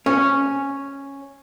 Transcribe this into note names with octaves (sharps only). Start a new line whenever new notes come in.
C#4